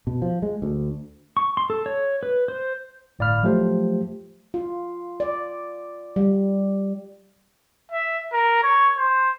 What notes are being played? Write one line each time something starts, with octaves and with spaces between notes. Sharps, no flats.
B2
F3
G#3
D2
C#6
C6
A4
C#5
B4
C5
G1 A2 D5 F5 B5 F6
F3 F#3 A3 F4 G4 C5
F4
D5
G3
E5
A#4
C#5
C5